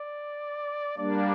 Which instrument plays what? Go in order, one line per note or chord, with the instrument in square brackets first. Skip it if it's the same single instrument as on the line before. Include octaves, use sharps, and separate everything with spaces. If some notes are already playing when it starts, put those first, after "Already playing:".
Already playing: [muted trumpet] D5
[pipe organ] G3 A#3 D4 [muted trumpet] D5